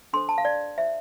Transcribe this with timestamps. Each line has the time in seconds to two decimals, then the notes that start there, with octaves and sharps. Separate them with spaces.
0.13 D4 A4 C5 C6
0.29 A5
0.38 F5
0.45 D5
0.78 F4 C5 E5